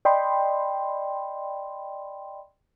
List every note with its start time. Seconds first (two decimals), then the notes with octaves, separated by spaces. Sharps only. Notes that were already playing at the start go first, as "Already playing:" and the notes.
0.05 D5 D#5 G5 B5 C6